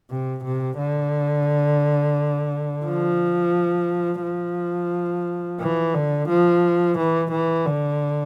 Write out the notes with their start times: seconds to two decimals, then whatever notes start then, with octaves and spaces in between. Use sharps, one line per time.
0.10 C3
0.44 C3
0.78 D3
2.85 F3
4.23 F3
5.60 E3
5.94 D3
6.29 F3
6.98 E3
7.32 E3
7.66 D3